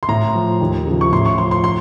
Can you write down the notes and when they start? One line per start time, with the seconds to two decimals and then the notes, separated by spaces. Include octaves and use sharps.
0.03 C6
0.08 A2 A#5
0.35 F3
0.61 D#2
0.87 C#3 F3
1.01 C#6
1.12 A2 C6
1.26 C#6
1.38 F3 C6
1.51 C6
1.64 C6